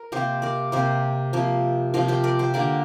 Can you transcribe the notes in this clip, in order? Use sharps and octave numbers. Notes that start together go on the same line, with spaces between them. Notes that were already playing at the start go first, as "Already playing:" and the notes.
Already playing: A#4
C3 A#3 G4 C5
A#4 D5
C3 A#3 G4 C5
C3 F3 A#3
C3 F3 A#3 F4 A#4
G4 C5
A#4 D5
G4 C5
D3 A#3 A#4 D5